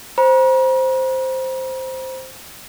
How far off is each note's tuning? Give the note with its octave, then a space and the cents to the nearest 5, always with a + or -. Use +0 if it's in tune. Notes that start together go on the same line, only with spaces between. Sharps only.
C5 +0 A#5 +45